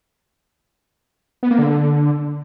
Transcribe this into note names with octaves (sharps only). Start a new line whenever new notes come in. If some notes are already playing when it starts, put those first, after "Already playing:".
B3
A#3
D3